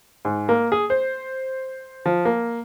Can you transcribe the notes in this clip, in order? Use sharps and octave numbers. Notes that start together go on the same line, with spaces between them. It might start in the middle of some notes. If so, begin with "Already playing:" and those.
G#2
A#3
G#4
C5
F3
A#3